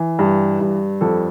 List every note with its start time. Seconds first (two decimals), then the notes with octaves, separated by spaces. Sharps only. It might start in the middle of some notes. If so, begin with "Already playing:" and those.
Already playing: E3
0.19 G2
0.60 G2
1.01 F2 A4